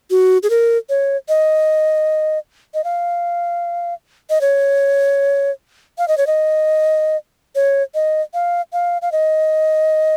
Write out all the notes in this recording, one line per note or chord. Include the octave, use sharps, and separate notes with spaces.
F#4
G#4
A#4
C#5
D#5
D#5
F5
D#5
C#5
F5
D#5
C#5
D#5
C#5
D#5
F5
F5
F5
D#5